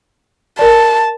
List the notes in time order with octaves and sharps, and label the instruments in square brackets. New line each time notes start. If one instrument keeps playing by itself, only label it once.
[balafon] A#4 D5 [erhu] A5